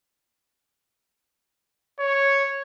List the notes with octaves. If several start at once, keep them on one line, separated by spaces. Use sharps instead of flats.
C#5